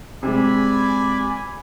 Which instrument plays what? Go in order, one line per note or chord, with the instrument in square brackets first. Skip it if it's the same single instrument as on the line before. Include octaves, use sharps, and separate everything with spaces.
[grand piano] C3 G#3 [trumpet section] D5 G#5 B5